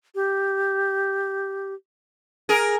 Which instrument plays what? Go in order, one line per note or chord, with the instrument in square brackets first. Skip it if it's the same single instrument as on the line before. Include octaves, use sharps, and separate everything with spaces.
[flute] G4
[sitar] G#4 A#4